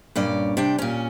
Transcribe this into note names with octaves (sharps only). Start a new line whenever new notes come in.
G2 A#2 C#4 D5
C3 D4 G5
A#2 C#4